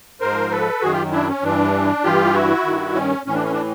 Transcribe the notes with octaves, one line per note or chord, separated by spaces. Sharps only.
G#2 F3 A#4 C5
A4 B4
F#2 D#3 F#4 G#4
F4 G4
D4 E4
C#4
G2 E3 D4
G2 E3 F4 G4
E4 F#4
G2 D#3
C#4
A2 E3 C#4
D4
C#4
D4